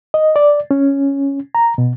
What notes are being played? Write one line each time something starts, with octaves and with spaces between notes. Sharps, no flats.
D#5
D5
C#4
A#5
B2